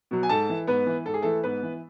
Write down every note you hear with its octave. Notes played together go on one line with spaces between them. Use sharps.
B2 F#3
G#5
G#2 A4 A5
E3
G#2 B3 B4
E3
G#2 A4
G#4
E3 A3 A4
G#2 B3 B4
E3